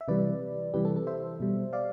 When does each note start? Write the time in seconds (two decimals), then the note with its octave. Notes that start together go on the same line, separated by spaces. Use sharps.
0.01 E5
0.08 C3 E3 G3 B4 D5
0.74 C3 E3 G3 G4 B4
0.85 A4
0.96 A4
1.07 C5 E5
1.40 B2 G3
1.73 D5 F5